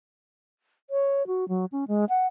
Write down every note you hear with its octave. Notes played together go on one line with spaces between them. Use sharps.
C#5
F#4
F#3
C#4
G#3
F#5